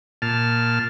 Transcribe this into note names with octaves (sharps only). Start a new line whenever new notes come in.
A#2 A5 F6